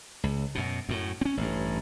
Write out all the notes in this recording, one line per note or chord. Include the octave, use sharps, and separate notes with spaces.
C#2
F#2 B2
F#2 A2
C4 C#4
A1 G2